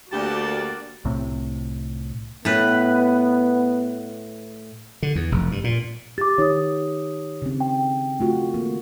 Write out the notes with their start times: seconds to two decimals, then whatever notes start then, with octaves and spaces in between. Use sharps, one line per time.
0.12 D2 A#3 F#4 G4 D5 A5
1.05 C2 A2 C3
2.45 A2 B3 B4
5.03 D3
5.16 E2
5.32 F1
5.52 G2
5.64 A#2
6.18 G4 D6 A6
6.38 D#3 D#4 G4 C#5 D#6
7.42 C#3 C4
7.61 G5
8.20 A3 F4 F#4
8.54 D#3 A#3